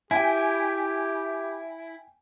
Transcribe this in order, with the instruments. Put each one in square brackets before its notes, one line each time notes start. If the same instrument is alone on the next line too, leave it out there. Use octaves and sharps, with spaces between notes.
[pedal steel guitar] E4 [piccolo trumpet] G4 [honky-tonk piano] G5 G#5